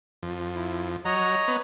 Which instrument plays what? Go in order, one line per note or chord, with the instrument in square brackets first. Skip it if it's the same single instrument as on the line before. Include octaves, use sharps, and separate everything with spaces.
[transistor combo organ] F2
[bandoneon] E4
[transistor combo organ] F#3 [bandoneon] C#5 D#5 A#5
[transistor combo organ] B3